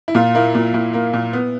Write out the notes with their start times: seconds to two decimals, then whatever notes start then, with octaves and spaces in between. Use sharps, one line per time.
0.08 E4
0.15 A#2 F4
0.35 A#3 E4
0.55 A#2
0.74 A#2 E4
0.93 A#3
1.13 A#2
1.33 B3